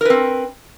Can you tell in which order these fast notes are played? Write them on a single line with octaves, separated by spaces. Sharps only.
A#4 B4 C4